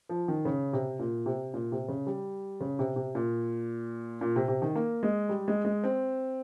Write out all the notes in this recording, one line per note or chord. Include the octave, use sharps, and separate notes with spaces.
F3
D#3
C#3
C3
A#2
C3
A#2
C3
C#3
G3
C#3
C3
C3
A#2
A#2
C3
C3
D#3
A#3
G#3
G3
G#3
G#3
C4